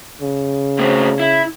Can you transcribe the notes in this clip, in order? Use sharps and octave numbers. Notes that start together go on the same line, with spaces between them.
C#3
A2 C4
E4